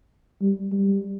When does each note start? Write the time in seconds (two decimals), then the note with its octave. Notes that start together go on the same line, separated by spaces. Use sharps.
0.41 G3
0.72 G3